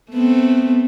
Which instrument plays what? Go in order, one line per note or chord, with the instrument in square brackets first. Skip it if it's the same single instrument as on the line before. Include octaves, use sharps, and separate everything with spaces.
[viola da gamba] A3 B3 C4